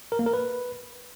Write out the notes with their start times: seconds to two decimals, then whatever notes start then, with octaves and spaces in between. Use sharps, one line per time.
0.12 A#4
0.19 A#3
0.26 A#4
0.33 B4